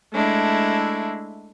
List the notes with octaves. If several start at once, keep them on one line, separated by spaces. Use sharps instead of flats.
G#3 A3 D4 E4